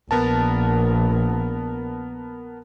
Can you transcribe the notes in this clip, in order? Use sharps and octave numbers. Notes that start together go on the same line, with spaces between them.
A#1 B3 A#4 A5